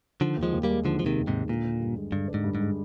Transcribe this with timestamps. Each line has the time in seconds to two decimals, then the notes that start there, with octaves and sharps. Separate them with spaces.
0.21 D3 D#3 F3
0.37 D#2
0.43 F3 G#3
0.53 D#2
0.63 G3 A#3
0.70 G#3
0.85 D3 D#3 F3
0.99 D#2 F3
1.06 C3 D#3
1.18 D#2
1.27 G#2 C3 G#3
1.49 A#2 D3
1.64 D4
1.80 G2
1.96 G#3
2.12 G2 D3
2.28 D4
2.34 G#2
2.44 G2
2.55 G#2
2.60 G#3